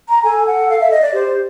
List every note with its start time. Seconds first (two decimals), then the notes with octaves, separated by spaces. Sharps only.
0.09 A#5
0.23 A4 G#5
0.47 F#5
0.69 F5
0.81 E5
0.91 D#5
1.02 D5
1.13 G4 C5